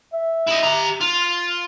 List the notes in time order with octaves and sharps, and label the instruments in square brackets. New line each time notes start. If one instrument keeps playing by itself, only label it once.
[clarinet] E5
[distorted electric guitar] E4 D#5
G4 A#5
F4
[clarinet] F6